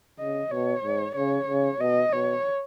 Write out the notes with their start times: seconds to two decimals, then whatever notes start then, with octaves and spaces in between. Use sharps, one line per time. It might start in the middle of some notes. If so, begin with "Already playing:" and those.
0.20 C#3 D#5
0.51 B2 C#5
0.84 G#2
1.16 C#3 C#5
1.47 C#3
1.80 B2 D#5
2.12 B2 C#5